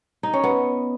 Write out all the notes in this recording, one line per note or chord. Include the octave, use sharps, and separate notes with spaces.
D#4
C#4
B3